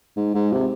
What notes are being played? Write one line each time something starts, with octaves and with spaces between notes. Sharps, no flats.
G#2
G#2
C3